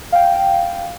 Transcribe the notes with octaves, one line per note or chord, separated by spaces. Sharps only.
F5 G5